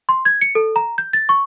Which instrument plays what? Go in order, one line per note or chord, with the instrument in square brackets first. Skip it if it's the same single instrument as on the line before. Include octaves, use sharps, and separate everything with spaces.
[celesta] C6
G#6
C#7
A4
A#5
G6
A6
C#6